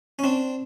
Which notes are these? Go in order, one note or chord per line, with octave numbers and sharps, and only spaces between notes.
C#4
C4 D4